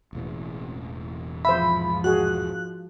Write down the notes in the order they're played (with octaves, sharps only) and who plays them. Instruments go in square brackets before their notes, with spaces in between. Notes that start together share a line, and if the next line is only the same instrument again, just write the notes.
[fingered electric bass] E1 A1 E2
[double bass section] G#2 F3 [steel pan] C5 E5 [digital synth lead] B5
[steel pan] F#4 G#4 [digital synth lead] F#6